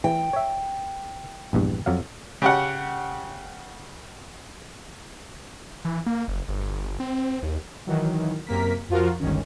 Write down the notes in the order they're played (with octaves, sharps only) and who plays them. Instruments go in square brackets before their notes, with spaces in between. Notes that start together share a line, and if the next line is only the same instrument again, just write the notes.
[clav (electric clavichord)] E3 [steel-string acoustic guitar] G5
[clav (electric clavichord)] C#5 E5
A#1 E2 G2
F2 F#3 F5
[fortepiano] C#3 G4 F#5
[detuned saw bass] E3
A#3
F#1
G1
C4
D#2
[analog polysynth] D#3 E3 F#3
F#2 C3 A#3 A#4 B6
F2 F3 F4 F#4 A#4
G1 C#2 D#3 C#4